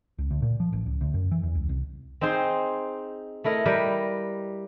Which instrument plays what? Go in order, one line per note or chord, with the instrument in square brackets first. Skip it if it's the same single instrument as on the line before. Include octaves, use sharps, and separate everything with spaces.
[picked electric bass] C#2
D2
A#2
F3
A1
C#2
D2
F#2
E3
E2
C#2
C2
[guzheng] C4 D#4 G#4 C5
A3 E4 A#4 D#5
G3 G4 A#4 B4